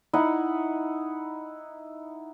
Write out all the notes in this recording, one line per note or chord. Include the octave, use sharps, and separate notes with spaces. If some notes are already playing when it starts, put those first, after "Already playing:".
D#4 E4 F#5